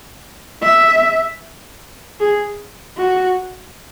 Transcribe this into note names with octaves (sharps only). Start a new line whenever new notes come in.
E5
G#4
F#4